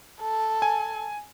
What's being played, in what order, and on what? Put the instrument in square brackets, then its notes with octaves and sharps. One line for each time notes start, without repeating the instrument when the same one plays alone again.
[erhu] A4
[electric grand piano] G#5